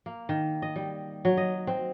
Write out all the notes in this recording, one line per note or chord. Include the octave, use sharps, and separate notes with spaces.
A#3
D#3
D#5
G3
F#3
D#5
C4